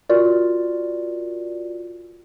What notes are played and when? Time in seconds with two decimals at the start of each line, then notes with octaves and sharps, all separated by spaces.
0.09 F4 F#4 A#4 D5